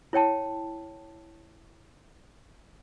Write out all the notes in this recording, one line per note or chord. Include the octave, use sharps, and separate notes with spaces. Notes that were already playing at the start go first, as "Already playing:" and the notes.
E4 C#5 G5 A5